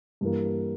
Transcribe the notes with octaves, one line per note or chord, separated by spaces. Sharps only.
G2 E3 A#3